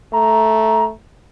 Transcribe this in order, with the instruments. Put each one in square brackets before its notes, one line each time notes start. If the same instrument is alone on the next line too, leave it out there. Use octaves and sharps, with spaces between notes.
[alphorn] A3 [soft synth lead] A#5